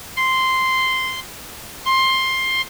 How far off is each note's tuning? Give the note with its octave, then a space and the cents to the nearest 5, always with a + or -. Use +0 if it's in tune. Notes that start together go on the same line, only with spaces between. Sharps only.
C6 -5
C6 +15